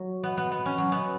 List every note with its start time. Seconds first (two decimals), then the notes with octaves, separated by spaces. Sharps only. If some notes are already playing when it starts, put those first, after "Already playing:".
Already playing: F#3
0.23 B3
0.37 B3
0.52 B3
0.65 C#4
0.78 F#3
0.92 B3